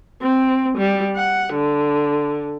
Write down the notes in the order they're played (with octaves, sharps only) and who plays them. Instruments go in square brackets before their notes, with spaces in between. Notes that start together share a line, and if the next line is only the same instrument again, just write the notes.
[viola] C4
G3
F#5
D3